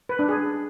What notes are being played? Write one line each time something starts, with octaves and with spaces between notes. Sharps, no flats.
B4
D4
G#4